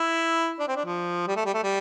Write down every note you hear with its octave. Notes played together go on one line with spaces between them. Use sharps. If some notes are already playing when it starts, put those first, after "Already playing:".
Already playing: E4
D4
C4
D4
F3
G3
A3
G3
A3
G3